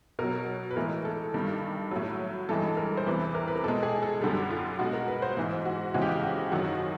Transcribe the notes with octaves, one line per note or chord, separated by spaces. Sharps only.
B2 F#3 A#4
B4
A2 E3 G#3 A#4
A4
G2 D#3 G3
A2 F#3
G2 E3 G#3 A4
A#4
C5
E2 C3 E3 G3 B4
A#4
B4
A#4
B2 G#3 A4
G#4
A4
F#2 D3 G3
F4
B2 G#3 F#4
A#4
B4
C5
G#2 E3 G#3
F#4
F2 C#3 E3 G#3 F#4
G4
F#4
F#4
F#2 D#3 F#3 F#4